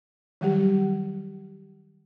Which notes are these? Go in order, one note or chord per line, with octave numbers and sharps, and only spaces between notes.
D#3 F#3 G3 G4